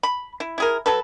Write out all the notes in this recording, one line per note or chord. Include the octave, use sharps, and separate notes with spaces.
B5
E4
E4 G#4 A#4
F#3 A4 B4